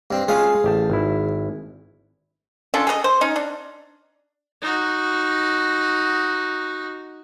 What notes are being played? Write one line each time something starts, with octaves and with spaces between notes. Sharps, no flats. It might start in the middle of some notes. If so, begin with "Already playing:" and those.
G2 C4
G#3 C#4 F4 G#4 F5
A1 G4 A5
G#1 E4
C#4 D4 F4 A4
G#4 A4 B4 D#5
C5
C#4 D#4
D4
D#4 F#4